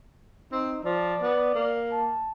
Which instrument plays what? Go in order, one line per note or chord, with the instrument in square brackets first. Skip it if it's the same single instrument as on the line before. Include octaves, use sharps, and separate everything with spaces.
[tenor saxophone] C4 [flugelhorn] D#4
[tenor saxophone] F3 [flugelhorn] D5
[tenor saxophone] B3
A#3
[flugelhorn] A5